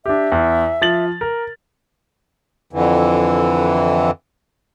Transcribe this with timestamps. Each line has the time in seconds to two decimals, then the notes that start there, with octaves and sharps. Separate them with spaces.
0.06 D4 G4 E5
0.32 E2
0.81 F3 A6 F#7
1.21 A#4
2.73 F2 D3 E3